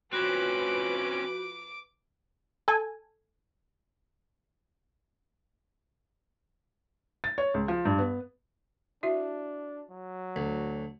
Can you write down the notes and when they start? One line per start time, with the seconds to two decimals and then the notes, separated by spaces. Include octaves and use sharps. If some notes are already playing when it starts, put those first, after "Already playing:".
0.13 F3 C4 C#4 F#4 B4 D6
2.68 A4 G#5
7.24 A6
7.38 C#5
7.54 C#2
7.68 F3
7.85 G2
7.98 B3
9.03 D4 E4 F#4 E5
9.91 F#3
10.36 D2